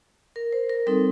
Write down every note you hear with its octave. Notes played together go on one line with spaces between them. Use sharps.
A#4
C5
A#4
G3 C4 D#4 A4